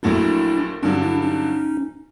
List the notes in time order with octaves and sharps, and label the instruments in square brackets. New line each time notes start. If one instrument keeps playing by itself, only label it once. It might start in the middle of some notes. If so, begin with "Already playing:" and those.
[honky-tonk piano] A#1 A#2 F#3 A3 [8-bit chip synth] D4 E4
[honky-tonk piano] G2 D3 F#3 [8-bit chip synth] C#4 D#4
[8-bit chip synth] D4 E4
C#4 D#4